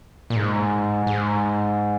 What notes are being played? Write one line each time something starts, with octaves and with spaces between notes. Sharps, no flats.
A#2
G#2
G#2